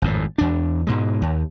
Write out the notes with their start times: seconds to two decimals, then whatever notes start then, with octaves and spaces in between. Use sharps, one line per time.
0.02 G#1 F2 A2
0.38 E2 D4
0.87 G#2 B2 G#3
1.22 D#2